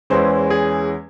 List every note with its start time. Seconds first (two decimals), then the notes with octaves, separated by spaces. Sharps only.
0.10 E2 E3 G#3 C#4 C5
0.50 G#4